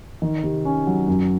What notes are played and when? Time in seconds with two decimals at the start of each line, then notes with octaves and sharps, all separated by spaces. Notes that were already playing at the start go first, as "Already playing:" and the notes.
0.22 D#3
0.43 C3
0.65 C#4
0.87 F#3
1.08 F#2